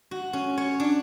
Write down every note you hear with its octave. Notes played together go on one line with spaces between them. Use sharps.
F#4
C#4
C#5
D4